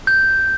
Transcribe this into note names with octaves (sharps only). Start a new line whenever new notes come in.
G6